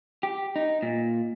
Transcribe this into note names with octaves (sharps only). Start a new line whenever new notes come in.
G4
D#4
A#2